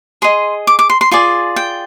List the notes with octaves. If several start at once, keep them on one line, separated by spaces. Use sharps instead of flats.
G#4 D#5 C6
D6
D6
C6
C6
F4 G#4 D5 G#5
G5